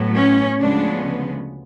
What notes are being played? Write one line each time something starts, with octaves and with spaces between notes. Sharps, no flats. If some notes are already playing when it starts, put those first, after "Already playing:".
Already playing: A2 F#3 B3
C#4
D2 C#3 F3 G#3 B3 D4